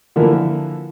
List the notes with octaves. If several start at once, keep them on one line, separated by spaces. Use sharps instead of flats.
D3 E3 F3 A#3